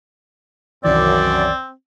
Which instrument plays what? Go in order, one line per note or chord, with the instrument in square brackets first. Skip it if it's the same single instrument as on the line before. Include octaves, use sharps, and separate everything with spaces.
[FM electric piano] C2 D#3 E3 [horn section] F#2 [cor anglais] C4 [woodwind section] D5